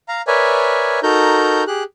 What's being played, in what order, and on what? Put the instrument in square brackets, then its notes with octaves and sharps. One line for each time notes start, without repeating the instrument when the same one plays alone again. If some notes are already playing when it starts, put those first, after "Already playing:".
[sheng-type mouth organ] F5 A#5
A#4 B4 C#5 D5 E5 G#5
D#4 F#4 A4 A#4 A#5 G6
G4 G#4 F#6